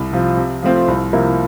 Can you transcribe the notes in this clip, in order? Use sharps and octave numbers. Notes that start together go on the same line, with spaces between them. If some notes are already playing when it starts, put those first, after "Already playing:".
Already playing: C2
C3 F3
C3
F3 A3 C4 F4
C2
C3 F3 A#3 E4